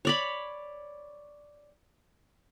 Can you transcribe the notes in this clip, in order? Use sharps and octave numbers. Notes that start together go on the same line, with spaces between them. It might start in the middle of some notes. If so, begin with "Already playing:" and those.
C#5 D5 B5